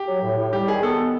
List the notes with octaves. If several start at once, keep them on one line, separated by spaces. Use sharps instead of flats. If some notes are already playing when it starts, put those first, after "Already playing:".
Already playing: G4
F#3
A2
A2
G3 G4
D#3 G#4
B3 A4